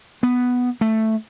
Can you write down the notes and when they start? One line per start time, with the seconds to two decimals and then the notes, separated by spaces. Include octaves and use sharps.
0.23 B3
0.81 A3